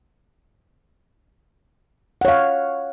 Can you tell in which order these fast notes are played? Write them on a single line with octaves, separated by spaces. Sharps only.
F#5 C#5 F5